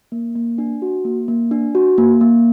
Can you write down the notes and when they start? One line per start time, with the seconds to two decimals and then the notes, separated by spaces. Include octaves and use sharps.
0.12 A#3
0.36 A#3
0.58 D4
0.82 F#4
1.05 A#3
1.28 A#3
1.51 D4
1.75 F#4
1.98 A#3
2.21 A#3